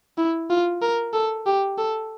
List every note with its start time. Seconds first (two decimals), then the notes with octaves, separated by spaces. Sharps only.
0.18 E4
0.50 F4
0.82 A#4
1.13 A4
1.46 G4
1.78 A4